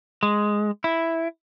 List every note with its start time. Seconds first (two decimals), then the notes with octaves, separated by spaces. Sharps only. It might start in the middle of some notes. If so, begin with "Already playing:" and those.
0.23 G#3
0.84 E4